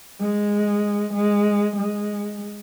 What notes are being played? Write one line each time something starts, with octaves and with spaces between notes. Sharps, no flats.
G#3
G#3
G#3